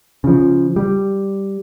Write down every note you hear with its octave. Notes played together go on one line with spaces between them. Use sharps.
C#3 F3
G3